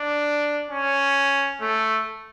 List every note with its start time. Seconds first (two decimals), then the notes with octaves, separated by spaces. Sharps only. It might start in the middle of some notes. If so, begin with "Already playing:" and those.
Already playing: D4
0.71 C#4
1.61 A3